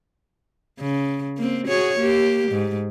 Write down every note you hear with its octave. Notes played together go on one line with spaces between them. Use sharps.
C#3
A#3 C4
F#4 G#4 C#5
A#3 G4
G#2